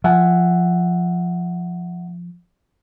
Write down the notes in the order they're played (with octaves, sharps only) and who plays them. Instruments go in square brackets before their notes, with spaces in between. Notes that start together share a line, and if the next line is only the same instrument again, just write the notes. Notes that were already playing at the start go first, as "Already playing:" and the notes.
[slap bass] F3 [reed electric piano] E5 F#5 G#5